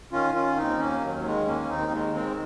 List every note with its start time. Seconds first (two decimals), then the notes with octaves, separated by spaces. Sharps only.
0.12 D#3 C#4 F4
0.34 D#3 C#4 F4
0.57 D#2 C4 D#4
0.79 D#2 A#3 C#4
1.02 D#3 F#3
1.25 D#3 G#3
1.47 D#2 A#3 C#4
1.61 C#4
1.69 D#2 C4 D#4
1.92 D#3 G#3
2.14 D#3 G#3 C4